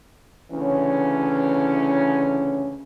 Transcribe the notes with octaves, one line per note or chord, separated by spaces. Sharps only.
D2 C#3 E3 C#4